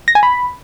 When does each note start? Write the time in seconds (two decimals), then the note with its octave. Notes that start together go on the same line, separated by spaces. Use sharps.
0.08 A#6
0.15 G#5
0.23 B5